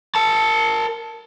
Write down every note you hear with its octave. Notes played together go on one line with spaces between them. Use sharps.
A#4 A5